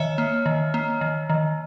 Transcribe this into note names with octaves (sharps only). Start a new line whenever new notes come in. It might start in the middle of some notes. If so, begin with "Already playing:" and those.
Already playing: D#3 C#5 E5
A#3
D#3
A#3
D#3
D#3